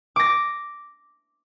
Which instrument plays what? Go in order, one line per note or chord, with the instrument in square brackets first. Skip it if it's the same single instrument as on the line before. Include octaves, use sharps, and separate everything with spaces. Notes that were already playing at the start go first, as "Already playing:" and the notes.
[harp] D6 A#6